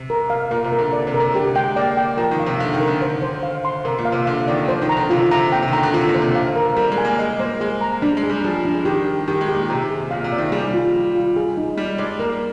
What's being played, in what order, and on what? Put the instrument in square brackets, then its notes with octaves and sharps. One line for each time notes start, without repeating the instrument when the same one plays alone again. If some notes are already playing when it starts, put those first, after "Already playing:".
Already playing: [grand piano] C3
[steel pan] A#4
F5
[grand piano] A#2 [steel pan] A#4
[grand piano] C3
[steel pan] A#4
[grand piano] D3
[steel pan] D5
[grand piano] C3
[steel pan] A#4
[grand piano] C3
[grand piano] D3 [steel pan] G4
[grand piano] G#3 [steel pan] G5
[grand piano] A#3 [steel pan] D5
[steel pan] G5
[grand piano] F3 [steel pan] A#4
[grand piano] D#3
[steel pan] F5
[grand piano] C3
[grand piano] D3 [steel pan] F5
[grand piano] D#3
[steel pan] A#4
[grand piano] D3
[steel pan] C5
C5
F5
C6
[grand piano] C3 [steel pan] A#4
[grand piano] A#2
[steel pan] F5
[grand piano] C3
[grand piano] D3 [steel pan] F5
[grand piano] D#3 [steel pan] D5
[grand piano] F3 [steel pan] C5
[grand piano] D#3
[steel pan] A#5
[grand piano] D3
[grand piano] C3 [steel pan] F4
[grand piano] C3 [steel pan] A#5
[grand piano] A#2 [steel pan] G5
[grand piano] C3
D#3
[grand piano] D3 [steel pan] A#5
[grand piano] D3
[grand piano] C3 [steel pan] F4
[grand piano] A#2
[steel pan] C5
[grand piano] C3
[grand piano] D3 [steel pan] F5
[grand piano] C3 [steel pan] A#4
[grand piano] G3 [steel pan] A#4
[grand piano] G#3
[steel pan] G#5
[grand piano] A#3
[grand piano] G#3 [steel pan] D#5
[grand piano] A#3 [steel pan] C5
[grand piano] G#3 [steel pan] G#4
[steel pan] A#5
[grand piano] G3 [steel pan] D4
[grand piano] G#3
[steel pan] G#4
[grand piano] G3
[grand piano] F3 [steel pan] G#4
[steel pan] D4
[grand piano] D#3 [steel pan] G4
[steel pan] G4
[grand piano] D#3 [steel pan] G4
[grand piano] G#3
[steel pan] G4
[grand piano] A#2
[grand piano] C3 [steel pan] A#5
[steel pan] G#4
[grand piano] A#2 [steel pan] F5
[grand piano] C3
[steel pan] D5
[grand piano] D#3
[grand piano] G3 [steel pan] G#4
[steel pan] F4
F4
F4
G#4
D#4
[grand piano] G3 [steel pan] D#4
[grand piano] G#3 [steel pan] D5
[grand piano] A#3 [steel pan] A#4